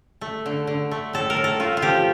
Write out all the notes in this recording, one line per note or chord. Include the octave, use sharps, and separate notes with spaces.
A3
D3
D3
A3
A2 A4
A#4
A2
A4
A3 F4
F4
F3 G4